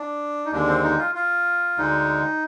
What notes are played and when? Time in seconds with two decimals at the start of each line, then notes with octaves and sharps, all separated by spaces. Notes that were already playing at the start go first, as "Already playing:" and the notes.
Already playing: D4
0.45 D#4
0.51 D#2 D3 G#3 D4
0.67 C4
0.83 D#4
0.98 F4
1.15 F4
1.77 D2 D3 G#3 D#4